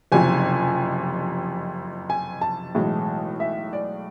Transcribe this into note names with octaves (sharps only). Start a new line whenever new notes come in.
F#1 F2 C3 G#5
G#5
A5
B1 A2 E3 G#3
E5
D5